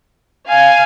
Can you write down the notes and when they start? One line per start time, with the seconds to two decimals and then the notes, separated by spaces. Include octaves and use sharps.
0.48 F5 G#5